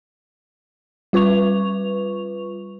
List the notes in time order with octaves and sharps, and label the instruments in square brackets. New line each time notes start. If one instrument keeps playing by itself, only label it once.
[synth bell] G3 F4 B4 C#6 F7